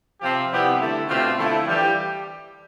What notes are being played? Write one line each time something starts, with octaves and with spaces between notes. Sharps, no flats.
C3 F3 C4 G4
C3 G3 B3 E4 G4
D3 A3 E4
B2 A3 C4 F4 G4
D3 F3 A3 E4
E3 G3 G4